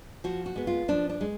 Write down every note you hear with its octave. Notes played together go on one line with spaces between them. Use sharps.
F3 F#4
F#4
G#3 B3
F4
F3 D4
D4
G#3